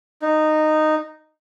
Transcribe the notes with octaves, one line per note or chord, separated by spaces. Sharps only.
D#4